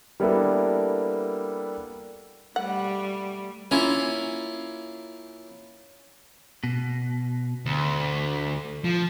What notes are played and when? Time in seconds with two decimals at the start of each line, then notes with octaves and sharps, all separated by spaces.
0.20 G3 A#3 B3 D4 E4 A4
2.56 G3 A3 F#5
3.71 A#3 C#4 E4 F4
6.64 B2
7.66 D2
8.84 F3